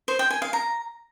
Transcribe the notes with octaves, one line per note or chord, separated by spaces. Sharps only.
C5
G5
G#5
F5
A#5